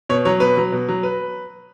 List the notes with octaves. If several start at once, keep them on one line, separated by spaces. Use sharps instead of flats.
B2 C#5
F#3 C#5
B2 B4
F#3
B2
F#3
B4